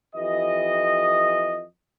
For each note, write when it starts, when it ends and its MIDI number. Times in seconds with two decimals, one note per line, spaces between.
0.15 1.65 41
0.15 1.65 52
0.15 1.65 67
0.15 1.65 75